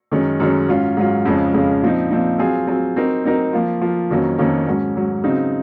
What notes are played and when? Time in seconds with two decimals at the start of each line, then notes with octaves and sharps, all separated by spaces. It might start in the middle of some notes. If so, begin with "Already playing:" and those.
0.12 F#2 D#3 G#3 C#4
0.40 F#2 D#3 G#3 C#4
0.68 G#2 F#3 C#4 F4
0.97 G#2 F#3 C#4 F4
1.25 F2 C#3 F3 G#3 C#4
1.53 F2 C#3 F3 G#3 C#4
1.82 A#2 F3 C4 D#4
2.10 A#2 F3 C4 D#4
2.38 F#3 C4 F4 G#4
2.67 F#3 C4 F4 G#4
2.96 F#3 C4 D#4 A#4
3.24 F#3 C4 D#4 A#4
3.53 F3 A#3 F4
3.81 F3 A#3 F4
4.10 F2 D#3 F#3 A#3 C#4
4.38 F2 D#3 F#3 A#3 C#4
4.66 G#2 F#3 C#4
4.96 G#2 F#3 C#4
5.24 C#3 F#3 C4 D#4